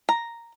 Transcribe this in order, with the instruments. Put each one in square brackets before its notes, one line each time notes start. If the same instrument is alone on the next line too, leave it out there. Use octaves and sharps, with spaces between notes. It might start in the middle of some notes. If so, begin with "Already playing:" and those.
[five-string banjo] A#5